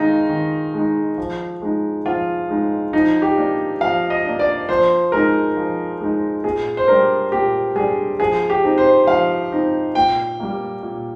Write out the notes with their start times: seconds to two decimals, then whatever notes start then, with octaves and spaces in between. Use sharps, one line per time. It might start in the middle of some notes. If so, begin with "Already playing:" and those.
Already playing: D#3 G#3 D#4 F4
0.29 D#3
0.74 G#3 D#4
1.18 F3
1.62 G#3 D#4
2.06 F3 F4
2.49 G#3 D#4
2.93 F3 D#4
3.22 G4
3.37 A#3 D4
3.81 F3 F5
4.10 D#5
4.25 A#3 D4
4.39 D5
4.69 F3 C5
5.12 G#3 D#4 A#4
5.57 F3
6.01 G#3 D#4
6.44 A#2 G#4
6.77 C5
6.88 G3 D4 A#4
7.32 A#2 G4
7.76 G3 D4 G#4
8.19 F3 G#4
8.50 G4
8.64 C4 D#4
8.78 C5
9.07 F3 F5
9.52 C4 D#4
9.95 A#2 G5
10.40 G3 A#3
10.83 A#2